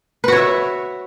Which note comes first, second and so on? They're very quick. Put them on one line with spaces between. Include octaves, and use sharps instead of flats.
B4 F#4 C#5 E5